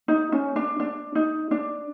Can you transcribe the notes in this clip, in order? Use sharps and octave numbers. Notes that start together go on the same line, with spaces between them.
D#4
C#4
D4
D4
D#4
D4